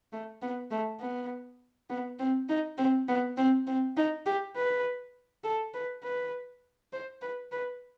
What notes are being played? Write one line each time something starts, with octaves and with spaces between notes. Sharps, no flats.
A3
B3
A3
B3
B3
C4
D#4
C4
B3
C4
C4
D#4
G4
B4
A4
B4
B4
C5
B4
B4